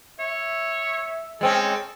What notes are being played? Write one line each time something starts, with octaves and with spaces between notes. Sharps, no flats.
C#5 E5
G#3 C4 C#4 A4